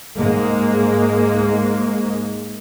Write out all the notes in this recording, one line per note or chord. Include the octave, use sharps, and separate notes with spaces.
G#2 G#3 A#3